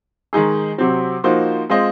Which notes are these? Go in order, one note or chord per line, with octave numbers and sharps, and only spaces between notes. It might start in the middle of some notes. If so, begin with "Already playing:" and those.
D#3 G#3 D#4 G#4
C3 F#3 C4
F3 A#3 D#4 F#4 C5
G#3 C4 F4 C5 D#5